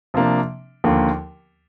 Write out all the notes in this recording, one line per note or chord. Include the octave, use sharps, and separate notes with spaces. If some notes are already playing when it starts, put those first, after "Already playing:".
C3 F3 A#3 D4
D#2 D3 F3 A#3